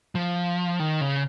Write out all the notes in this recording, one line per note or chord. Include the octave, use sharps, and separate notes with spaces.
F3
D#3
C#3